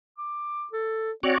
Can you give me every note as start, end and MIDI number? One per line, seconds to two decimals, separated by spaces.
0.18 0.67 86
0.72 1.12 69
1.23 1.36 60
1.23 1.38 66
1.23 1.38 73
1.23 1.38 74